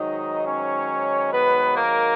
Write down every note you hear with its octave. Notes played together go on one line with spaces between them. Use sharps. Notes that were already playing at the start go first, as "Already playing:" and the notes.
Already playing: G#2 D#3 F#3 D#4 D#5
C#4 C#5
B3 B4
A#3 A#4